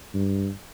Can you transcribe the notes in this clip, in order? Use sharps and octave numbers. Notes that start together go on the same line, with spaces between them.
G2